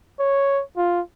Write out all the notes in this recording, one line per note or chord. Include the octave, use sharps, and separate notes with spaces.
C#5
F4